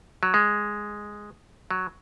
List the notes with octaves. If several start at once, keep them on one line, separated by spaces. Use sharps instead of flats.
F#3
G#3
F#3